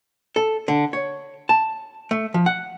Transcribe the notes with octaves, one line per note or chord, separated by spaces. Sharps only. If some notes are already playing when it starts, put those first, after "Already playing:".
A4
D3
C#5
A5
A3
F3
F#5